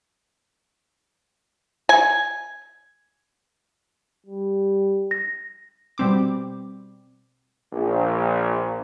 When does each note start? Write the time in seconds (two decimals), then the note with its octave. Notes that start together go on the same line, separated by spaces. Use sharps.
1.89 G#5
4.26 G3
5.11 A#6
5.98 B2 G3 C4 D6
7.73 A#1